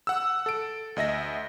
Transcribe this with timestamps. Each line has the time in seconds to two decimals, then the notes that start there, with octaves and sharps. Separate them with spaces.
0.07 F#5 E6
0.46 A4 D7
0.96 D2 D#5 E5 A#6